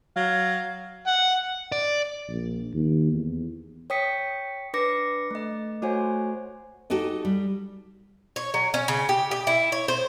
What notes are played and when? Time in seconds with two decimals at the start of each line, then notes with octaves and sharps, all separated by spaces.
0.16 F#3 F5
1.07 F#5
1.72 D5
2.28 A#1
2.73 D#2
3.13 E2
3.90 C#5 G5 D#6 B6 C#7
4.74 D4 B4 D6 A#6 C#7
5.31 A3 D#5
5.82 A3 F#4 C5 C#5 F#5 G#5
6.90 D#4 F#4 G4 A4 D#5
7.25 G3
8.36 C#5
8.54 F#3
8.74 C#4
8.88 C#3
9.09 G4
9.31 G4
9.47 E4
9.72 C#5
9.88 C5